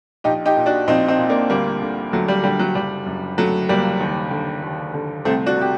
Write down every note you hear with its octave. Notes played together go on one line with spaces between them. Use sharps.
A#1 D#4 G4
D#4 G4
A#2
D4 F#4
A#1 C4 D#4
C4 D#4
A#2
A#3 D4
D2 G3 A#3
D3
D2 F#3 A3
G3
D3 G3
F#3
F#1 G3
F#2
D3 F#3 A3
F#1 G3 A#3
D#2
D3
D#2
D3
C2 A3 C4
D4 F#4
C3 G4